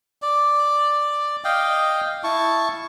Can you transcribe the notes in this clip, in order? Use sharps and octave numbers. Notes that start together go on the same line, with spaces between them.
D5
D#5 F5 G5
E4 A5 C#6